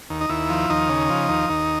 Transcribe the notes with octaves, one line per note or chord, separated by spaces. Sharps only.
D#2
D#4
D#2 E4
F3
D#2 D#4
C#3
F3
D#2
D#2